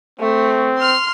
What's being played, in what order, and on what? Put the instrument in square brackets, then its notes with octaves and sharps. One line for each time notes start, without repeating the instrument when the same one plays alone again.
[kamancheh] A3 [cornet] C4
[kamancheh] C6 F6